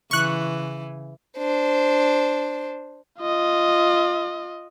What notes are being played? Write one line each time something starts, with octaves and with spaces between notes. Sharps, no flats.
C#3 E3 C#6 F#6
D4 C5
F4 D#5